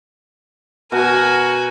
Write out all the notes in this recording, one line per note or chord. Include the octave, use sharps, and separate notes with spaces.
B2 F#4 A#4 G#5